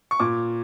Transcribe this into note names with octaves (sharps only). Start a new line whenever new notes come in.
C#6
A#2 D6